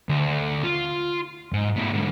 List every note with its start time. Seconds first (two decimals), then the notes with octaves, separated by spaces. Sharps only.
0.09 D2
0.63 F4
1.53 G#2
1.76 B2 A3
1.93 G#2 D3